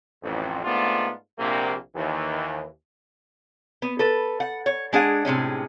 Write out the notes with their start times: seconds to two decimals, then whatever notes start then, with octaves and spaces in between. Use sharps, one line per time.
0.22 A1 F2
0.64 G#2 A3 B3 C4 D4 F4
1.39 A#1 C3 A#3
1.95 D#2 E3
3.82 B3
3.99 A4 B4
4.40 F#5
4.66 C#5
4.93 G#3 D4 G#4 F#5
5.25 A2 C3 G#3 C#4